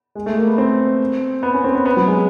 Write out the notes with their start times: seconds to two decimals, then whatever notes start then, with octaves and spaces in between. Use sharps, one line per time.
0.15 G#3
0.26 A3
0.36 A#3
0.47 B3
0.58 C4
1.43 B3
1.54 C#4
1.64 C4
1.75 B3
1.85 B3
1.97 F#3
2.07 G#3